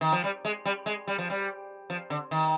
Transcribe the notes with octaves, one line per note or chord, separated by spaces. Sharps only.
D#3
F3
G3
G#3
G3
G#3
G3
F3
G3
F3
D3
D#3